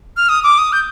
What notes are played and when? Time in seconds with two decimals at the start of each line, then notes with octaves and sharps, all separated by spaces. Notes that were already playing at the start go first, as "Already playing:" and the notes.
0.17 F6
0.29 D#6
0.43 D6
0.58 D#6
0.73 G6